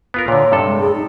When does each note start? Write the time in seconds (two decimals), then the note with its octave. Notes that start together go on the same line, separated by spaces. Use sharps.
0.14 B3 F4 A#4
0.28 A#2 D3 C#5
0.52 G2 C3 A4
0.67 G#3
0.80 G#4
0.95 D#4